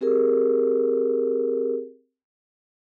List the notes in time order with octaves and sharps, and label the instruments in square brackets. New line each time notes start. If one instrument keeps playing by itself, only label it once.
[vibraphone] C4 G4 G#4 A#4